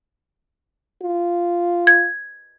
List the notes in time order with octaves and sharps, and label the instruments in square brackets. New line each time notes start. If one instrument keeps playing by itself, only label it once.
[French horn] F4
[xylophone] G#6